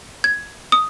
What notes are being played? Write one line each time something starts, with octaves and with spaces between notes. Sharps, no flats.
G#6
D#6